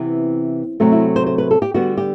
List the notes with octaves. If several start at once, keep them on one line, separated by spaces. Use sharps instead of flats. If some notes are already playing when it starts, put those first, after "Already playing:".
Already playing: C3 E3 B3 C4
C3 F#3 A3 C4
E4
C5
C5
B4
A4
G4
D3 G3 B3 F#4
G4